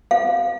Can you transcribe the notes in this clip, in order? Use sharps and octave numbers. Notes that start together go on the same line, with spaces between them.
F5